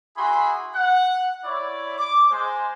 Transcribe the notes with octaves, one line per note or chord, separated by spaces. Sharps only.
E4 F#4 G#4 G#5 B5 C6
F#5
E4 C#5 D5
D6
G#3 C5